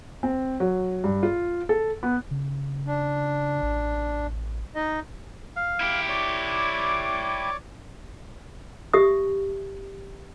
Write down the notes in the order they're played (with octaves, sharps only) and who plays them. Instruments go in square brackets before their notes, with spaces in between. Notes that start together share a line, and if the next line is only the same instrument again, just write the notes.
[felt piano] C4
F#3
G2
F4
A4
B3
[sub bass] C#3
[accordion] D4
[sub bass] A1
[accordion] D#4 D#5
[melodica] F5
[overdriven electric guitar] E4 G4
[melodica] C#5 D5 D6
[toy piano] G4 E5 D#6